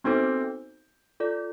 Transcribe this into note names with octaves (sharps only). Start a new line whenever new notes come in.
B3 C4 D#4 F#4 A4 C5
F4 A4 D5